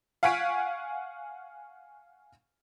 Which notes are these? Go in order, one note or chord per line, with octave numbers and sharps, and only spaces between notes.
F5 F#5 G#5 C#6 B6 D7